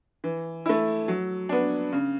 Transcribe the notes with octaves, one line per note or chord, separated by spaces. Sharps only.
E3
A3 E4
F#3
B3 D4
C#3